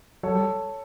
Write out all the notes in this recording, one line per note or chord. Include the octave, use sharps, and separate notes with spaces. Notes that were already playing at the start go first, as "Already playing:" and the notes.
F#3 A4 C#5
G3